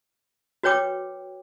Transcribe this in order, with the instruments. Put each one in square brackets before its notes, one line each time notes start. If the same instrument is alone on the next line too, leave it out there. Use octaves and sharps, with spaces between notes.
[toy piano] F#4 B4 C#5 G5 D6